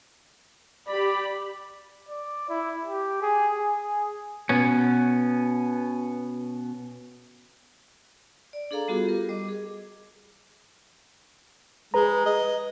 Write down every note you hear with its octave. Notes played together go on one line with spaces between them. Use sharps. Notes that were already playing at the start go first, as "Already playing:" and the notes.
G4 D5 B5
D5
E4
G4
G#4
G#4
B2 B3 C#4
D5
D4 G#4 A4 F5 A#5 D6
G3 B3 F4 F#4 G#4 A4
G4 A#4
G3 D#5 D6
G#4
G#3 B4 A#5
D#5